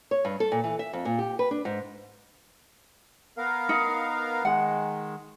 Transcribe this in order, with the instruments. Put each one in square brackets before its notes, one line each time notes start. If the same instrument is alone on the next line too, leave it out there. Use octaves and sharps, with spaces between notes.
[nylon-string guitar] C#5
G2
A4
A#2
E3
E5
F2
A#2
G4
B4
D4
G#2
[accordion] B3 A#4 F5
[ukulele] D#4
[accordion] D#3 G#3 [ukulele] F#5